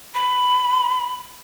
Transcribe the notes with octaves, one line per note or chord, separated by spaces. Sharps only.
B5